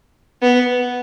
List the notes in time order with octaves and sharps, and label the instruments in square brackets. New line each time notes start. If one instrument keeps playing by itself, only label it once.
[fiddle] B3